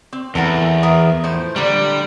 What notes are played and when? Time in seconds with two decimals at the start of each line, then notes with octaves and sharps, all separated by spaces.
0.13 C4
0.35 E2 A4 A#4 F#5
0.83 G#4 A#4 E5
1.23 A2 F3 C5
1.56 A#2 D3 G3